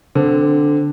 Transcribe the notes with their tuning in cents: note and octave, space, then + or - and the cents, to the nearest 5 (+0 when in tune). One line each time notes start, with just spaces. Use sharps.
D3 +0 C4 -15